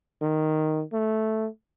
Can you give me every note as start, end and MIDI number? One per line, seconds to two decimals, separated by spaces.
0.22 0.83 51
0.93 1.47 57